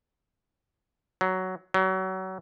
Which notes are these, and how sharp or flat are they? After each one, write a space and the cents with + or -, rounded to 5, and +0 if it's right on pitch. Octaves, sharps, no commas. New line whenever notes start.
F#3 +10
F#3 +30